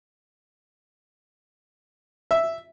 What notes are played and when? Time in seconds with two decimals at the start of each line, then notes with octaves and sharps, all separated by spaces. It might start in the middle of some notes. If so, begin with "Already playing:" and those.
2.31 E5